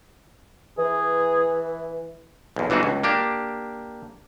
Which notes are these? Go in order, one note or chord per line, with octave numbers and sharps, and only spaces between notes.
E3 G#4
B1 E2
G1 E3 D4 D#4 F#4
C#2
A#3 D4 G4